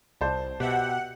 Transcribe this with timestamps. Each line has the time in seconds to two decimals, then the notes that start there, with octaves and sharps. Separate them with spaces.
0.21 C2 C5 D5 A5
0.60 B2 G4 E5 F#5